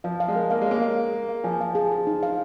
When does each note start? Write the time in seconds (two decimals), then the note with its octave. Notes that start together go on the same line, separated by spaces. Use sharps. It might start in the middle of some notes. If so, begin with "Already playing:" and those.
0.04 F3 F5
0.20 F5
0.28 G#3
0.36 A#4
0.50 A#3 F5
0.62 G#3
0.67 A#3 C#5
0.82 F5
0.98 G#4
1.13 G#4
1.29 F5
1.44 F3 G#5
1.61 F5
1.75 G#4
1.92 G#4
2.07 D#4
2.23 F5